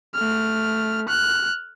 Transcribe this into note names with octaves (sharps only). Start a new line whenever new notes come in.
A3 F6
F6 F#6